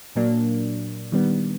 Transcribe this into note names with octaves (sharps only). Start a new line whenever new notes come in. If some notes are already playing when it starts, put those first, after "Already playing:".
A#2 F#3 A#3 D4
D#3 G3 B3